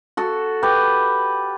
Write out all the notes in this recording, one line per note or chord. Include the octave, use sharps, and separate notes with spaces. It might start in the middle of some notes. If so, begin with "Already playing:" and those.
F#4 A4
G4 B4